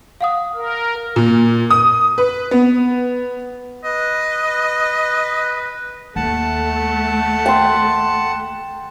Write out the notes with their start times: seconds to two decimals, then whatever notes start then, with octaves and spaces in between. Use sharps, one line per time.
0.21 F5 F#5 D#6
0.55 A#4
1.16 A#2
1.70 D#6
2.18 B4
2.51 B3
3.84 B4 D#5
6.16 D#2 A3 F#5 A5
7.46 G5 C6